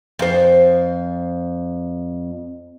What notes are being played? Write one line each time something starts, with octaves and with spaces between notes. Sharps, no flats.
F2 C5